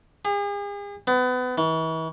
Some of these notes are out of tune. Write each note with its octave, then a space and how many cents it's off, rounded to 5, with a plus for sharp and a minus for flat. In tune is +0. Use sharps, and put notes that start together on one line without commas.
G#4 -40
B3 +30
E3 -40